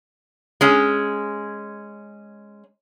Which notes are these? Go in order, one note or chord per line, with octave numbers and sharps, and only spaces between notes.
G#3 C#4